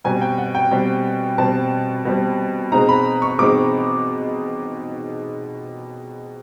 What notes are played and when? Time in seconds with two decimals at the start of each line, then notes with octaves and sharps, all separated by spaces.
0.04 B2 G3 C4 G#5
0.22 G5
0.38 F#5
0.55 G5
0.71 B2 G3 C4
1.38 B2 G3 C4 A5
2.05 B2 G3 C4
2.72 B2 G#3 C4 D#4 A#5
2.89 B5
3.22 C#6
3.38 B2 G#3 C4 D#4 D6